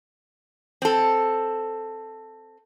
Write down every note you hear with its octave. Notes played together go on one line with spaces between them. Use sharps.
C4 A4